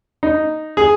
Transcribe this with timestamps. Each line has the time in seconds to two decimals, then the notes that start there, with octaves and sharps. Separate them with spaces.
0.23 D#4
0.77 G#4